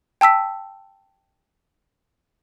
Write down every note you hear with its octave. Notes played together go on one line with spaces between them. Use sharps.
G5 A5 E6 B6